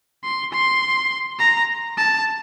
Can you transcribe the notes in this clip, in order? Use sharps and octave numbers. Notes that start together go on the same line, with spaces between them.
C6
C6
A#5
A5